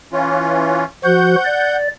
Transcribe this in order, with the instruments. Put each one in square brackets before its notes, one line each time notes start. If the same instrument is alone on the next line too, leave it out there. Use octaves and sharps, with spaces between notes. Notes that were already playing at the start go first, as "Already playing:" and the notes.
[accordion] E3 C#4 F4
[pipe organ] F3 F#4 C5 [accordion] F#5 G6
[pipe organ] D5